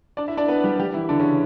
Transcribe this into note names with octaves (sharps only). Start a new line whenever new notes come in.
D4 D5
E4 E5
D4 D5
B3 B4
G3 G4
G3 G4
E3 E4
D3 D4
C#3 C#4